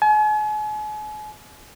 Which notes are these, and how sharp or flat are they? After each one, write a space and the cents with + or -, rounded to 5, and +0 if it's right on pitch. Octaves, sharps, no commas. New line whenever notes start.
G#5 +40